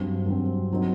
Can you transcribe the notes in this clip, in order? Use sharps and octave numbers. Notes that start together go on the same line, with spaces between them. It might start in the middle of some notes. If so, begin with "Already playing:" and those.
Already playing: G2 F#3 C4
G2 F#3 C4
F#3 C4 D#4